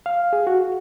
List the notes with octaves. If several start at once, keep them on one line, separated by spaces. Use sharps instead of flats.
F5
G#4
F#4